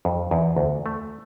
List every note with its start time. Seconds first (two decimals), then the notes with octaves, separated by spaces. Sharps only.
0.05 F2
0.31 E2
0.57 D2
0.86 A3